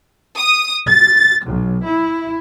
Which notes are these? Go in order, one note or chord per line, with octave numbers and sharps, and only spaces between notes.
D#6
A6
B1
E4